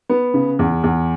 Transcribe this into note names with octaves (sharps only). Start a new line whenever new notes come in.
B3
C#3
E2
E2